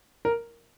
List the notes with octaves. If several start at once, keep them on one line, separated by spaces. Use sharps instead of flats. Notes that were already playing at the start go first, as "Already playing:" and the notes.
A#4